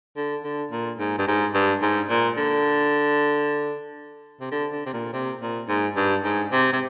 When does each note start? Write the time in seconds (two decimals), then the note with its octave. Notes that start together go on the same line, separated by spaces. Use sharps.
0.16 D3
0.44 D3
0.72 A#2
0.99 G#2
1.18 G2
1.27 G#2
1.54 G2
1.82 G#2
2.10 A#2
2.37 D3
4.41 C3
4.51 D3
4.73 D3
4.86 C3
4.93 A#2
5.13 C3
5.41 A#2
5.69 G#2
5.96 G2
6.24 G#2
6.52 C3
6.73 C3